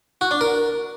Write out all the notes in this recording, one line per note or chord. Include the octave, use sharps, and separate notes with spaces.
F#4
D4
A#4